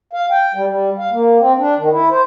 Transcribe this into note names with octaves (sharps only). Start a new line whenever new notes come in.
F5
G5
G3
G3
F5
A#3
C4
D4
D#3
E4
C5